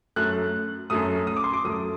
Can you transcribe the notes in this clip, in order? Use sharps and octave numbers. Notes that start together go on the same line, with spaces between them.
F#2 F#3 A3 F#6
F#2 F#3 A3 D#6
D#6
D6
C6
D6
F#2 F#3 A3 D#6